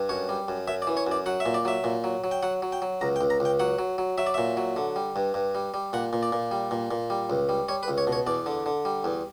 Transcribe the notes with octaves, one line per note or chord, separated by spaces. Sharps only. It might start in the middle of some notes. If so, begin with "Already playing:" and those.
Already playing: G2
F#2 C#5
G3
F#2
F#2 E5
D5
E3
C#5
F#2 D5
F#3 F#5
E5
A#2
D5
F#3 E5
A#2
F#3
F#3
G5
F#3 F#5
F#3
G5
F#3
C#2 A#5
G5
C#2
A#5
C#2 G5
F#3 F#5
F#3
F#3
F#3 E5
D5
A#2 E5
F#3
D3
G3
G2
G2
G3
G3
A#2 F#5
A#2
D5
A#2
G3
A#2
A#2
G3
C#2
G3
G3 C#5
B4
C#2
C#5
B2
C#5
E2 D5
D3
D3
G3
E2